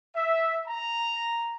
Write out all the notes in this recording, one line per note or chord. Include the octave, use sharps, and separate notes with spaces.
E5
A#5